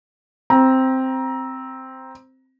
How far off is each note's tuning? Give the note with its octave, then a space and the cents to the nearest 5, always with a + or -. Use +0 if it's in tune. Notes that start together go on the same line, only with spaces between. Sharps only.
C4 +0 A#5 +20